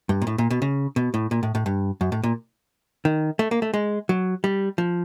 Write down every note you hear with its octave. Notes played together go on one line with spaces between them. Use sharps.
G2
A#2
A2
A#2
B2
C#3
B2
A2
A#2
A2
A2
G2
F#2
A2
A#2
D#3
A3
A#3
A3
G#3
F#3
G3
F3